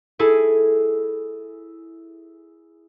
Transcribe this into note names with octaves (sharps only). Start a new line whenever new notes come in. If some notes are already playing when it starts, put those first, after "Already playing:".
E4 G#4 A4